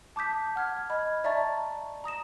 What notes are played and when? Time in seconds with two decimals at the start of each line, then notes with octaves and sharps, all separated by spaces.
0.16 A5 D6 D#6 G6 B6
0.56 F#5 F6 G#6
0.90 D#5 B5 F6 G#6
1.24 D5 E5 A5 A#5 C#6 A6
2.04 A#5 D#6 A#6 E7